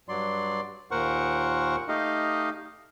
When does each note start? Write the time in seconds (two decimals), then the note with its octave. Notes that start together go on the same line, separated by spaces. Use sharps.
0.09 G2 F#3 D5 C6
0.91 D#2 A#2 A#4 C5 F#5 C#6
1.89 A3 D#4 G4 D#5 F5